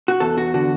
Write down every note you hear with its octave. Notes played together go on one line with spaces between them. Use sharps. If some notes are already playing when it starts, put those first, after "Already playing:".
F#4
E2 A4
F#4
D3 F#4